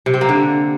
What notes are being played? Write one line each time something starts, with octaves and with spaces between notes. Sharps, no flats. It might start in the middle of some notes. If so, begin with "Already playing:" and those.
C3
C4
A#3
D3